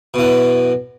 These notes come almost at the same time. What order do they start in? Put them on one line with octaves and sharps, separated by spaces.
B2 E3 F#2